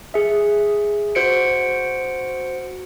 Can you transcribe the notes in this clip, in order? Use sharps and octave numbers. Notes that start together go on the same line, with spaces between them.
G#4 E5
F#4 C5 C#7 D7